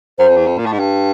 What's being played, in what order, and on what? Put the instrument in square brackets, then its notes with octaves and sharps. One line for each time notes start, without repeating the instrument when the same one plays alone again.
[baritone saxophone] F#2 [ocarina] C5
[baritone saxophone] F2
E2
F2
A#2
A2
G#2
G2